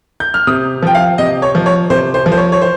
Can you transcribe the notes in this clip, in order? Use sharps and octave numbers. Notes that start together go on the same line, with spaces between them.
G6
F6
C3 D#6
F3 G5
F5
C3 D#5
C#5
F3
C#5
C3 C5
C5
F3
C5
C#5
C#5
C5